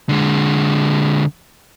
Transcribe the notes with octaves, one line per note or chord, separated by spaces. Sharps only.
D3 G#3